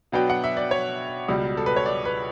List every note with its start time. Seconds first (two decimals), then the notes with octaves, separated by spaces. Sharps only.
0.12 B2 F#3 B3 D4 G5
0.30 F#5
0.44 E5
0.57 D5
0.71 C#5
1.28 C#2 B2 G3
1.57 A4
1.66 B4
1.76 C#5
1.86 D5
2.05 B4